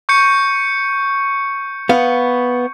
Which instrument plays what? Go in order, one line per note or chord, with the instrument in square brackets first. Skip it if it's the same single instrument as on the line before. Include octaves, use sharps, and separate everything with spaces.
[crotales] C#6 G6 C#7
[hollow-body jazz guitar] B3 F5